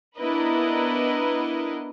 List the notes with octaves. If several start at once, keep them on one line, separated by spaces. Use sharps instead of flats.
B3 D4 E4 A#4 B4 D#5